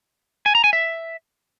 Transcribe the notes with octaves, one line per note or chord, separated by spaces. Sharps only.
G#5
A#5
G#5
E5